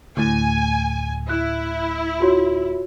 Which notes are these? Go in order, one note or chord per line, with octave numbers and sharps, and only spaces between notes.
D2 A2 G#5
E4 F#6
F4 F#4 C#5